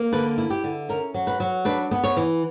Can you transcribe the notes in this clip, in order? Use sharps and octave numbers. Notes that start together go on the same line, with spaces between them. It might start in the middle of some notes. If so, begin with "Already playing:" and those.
Already playing: A#3
D3 B4
E4
G4
D3
C#4 A#4
F#3
B4
F#3
D4 B4
B3
C#5
E3